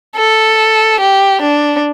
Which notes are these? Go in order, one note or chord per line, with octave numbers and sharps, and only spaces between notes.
A4
G4
D4